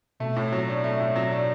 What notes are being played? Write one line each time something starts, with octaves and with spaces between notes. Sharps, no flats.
B2 A3
A2
F#3
D4
A3
A2
F#3
D4